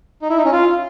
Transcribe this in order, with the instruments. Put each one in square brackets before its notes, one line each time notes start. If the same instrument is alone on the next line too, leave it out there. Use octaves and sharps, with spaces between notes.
[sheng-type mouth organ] D#4
E4
D#4
C#4
F4